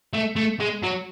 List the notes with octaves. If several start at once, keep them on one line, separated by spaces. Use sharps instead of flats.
A3
A3
G#3
F#3